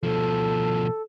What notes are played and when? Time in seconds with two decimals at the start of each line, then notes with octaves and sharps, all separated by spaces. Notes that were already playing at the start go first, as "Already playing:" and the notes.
0.03 B2 F3 A4